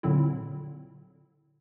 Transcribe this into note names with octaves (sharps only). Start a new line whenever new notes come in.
A#2 D3 F#3 C4 E4